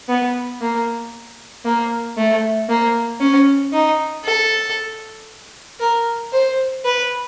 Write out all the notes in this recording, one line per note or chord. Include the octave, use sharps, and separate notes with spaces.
B3
A#3
A#3
A3
A#3
C#4
D#4
A4
A#4
C5
B4